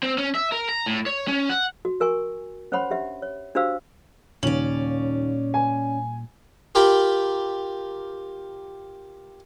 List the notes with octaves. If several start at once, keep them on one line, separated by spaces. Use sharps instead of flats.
C4
C#4
E5
A#4
A#5
A2
C#5
C#4
F#5
F#4
F#4 A#4 G#5 C#6
C#4 C5 C#5 F#5 B5 C6
D4 G4 E5 F#5
C#5
D4 F#4 G4 C5 F5 E6
D#2 A#2 C#3 G3 C#4 D5 F#7
G#5
F4 G4 A#4 G5 B5